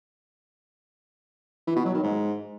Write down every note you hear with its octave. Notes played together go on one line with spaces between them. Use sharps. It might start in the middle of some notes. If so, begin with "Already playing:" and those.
E3
B2
F#3
D#3
G#2